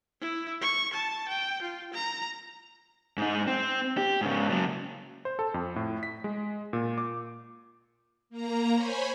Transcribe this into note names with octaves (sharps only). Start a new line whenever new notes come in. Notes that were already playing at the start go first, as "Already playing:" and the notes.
E4
C#6
A5
G5
F4
A#5
G#2 D#4
C4
G4
G#2 C#3
C#3 F#3
C5
A4
F2
A2
B6
G#3
A#2
D6
A#3 A#5
C5 C#5 G#5 B5